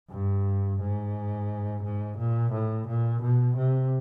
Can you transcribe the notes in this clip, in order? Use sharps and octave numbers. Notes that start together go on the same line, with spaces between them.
G2
G#2
G#2
A#2
A2
A#2
B2
C3